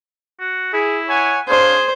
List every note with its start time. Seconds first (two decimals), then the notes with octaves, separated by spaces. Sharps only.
0.40 F#4
0.73 E4 G#4
1.09 C#5 F#5 G#5
1.48 D4 G#4 C5 C#5 F5